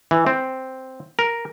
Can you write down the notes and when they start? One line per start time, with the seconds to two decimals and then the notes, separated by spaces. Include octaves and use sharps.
0.11 E3
0.27 C4
1.19 A#4